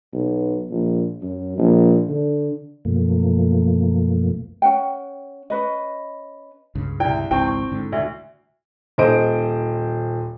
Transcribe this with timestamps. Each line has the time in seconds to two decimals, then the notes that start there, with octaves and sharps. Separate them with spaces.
0.13 B1
0.71 A#1
1.22 F#2
1.58 A#1
2.09 D3
2.85 F#2 B2 F3 A3 A#3
4.62 C#4 F#5 G5
5.50 C#4 B4 D#5
6.75 C#2 G2 C#3
7.00 C2 E4 D5 G5
7.31 G#1 C#2 G#2 C4 E4 G5 A5 C#6
7.48 C#6
7.72 G#2 D3
7.92 D2 D5 E5
8.98 D#1 C5 D#5 D7